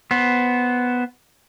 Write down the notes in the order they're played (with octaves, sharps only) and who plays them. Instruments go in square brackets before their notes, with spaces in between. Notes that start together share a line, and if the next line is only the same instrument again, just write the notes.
[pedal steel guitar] B3 C5